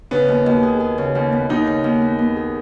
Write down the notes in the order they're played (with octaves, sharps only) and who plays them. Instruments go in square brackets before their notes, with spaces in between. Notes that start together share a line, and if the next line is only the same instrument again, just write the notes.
[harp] C#3 [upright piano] B3
[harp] D#2
D#2
G#4
G#4
C#3
D#2
B3
[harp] D#2 [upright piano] D#4
[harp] C#3
D#2
B3
B3
G#4